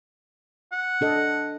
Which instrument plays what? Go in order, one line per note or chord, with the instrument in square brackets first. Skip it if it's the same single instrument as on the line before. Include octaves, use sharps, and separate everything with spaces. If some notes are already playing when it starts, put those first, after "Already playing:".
[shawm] F#5
[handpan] D4 A4 D#5